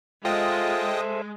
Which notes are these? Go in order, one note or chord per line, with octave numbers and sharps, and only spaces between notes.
G#3 F4 A4 C5 D#5 E5 G5 D#6